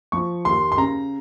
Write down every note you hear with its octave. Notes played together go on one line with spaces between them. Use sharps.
F3 C#6
D#2 C6
C6
C#3 A#5